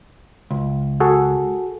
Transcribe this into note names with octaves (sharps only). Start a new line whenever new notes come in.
C#2
F#4 G#4 A4